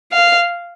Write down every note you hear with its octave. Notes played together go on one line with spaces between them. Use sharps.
F5